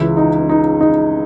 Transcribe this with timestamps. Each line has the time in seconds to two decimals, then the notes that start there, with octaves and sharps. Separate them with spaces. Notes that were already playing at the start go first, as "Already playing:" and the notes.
Already playing: C#2 C#3 E3 E4
0.17 D#4
0.49 D#4
0.81 D#4